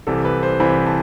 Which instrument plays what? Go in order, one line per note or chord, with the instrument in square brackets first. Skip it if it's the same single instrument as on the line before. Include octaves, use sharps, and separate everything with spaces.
[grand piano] C2 C3 E3 A4
B4
C5
C2 C3 E3 B5
A5